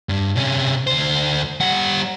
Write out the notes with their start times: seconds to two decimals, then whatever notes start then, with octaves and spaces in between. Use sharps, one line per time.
0.09 G2
0.36 C3 C#4
0.87 D2 C5
1.61 G3 F#5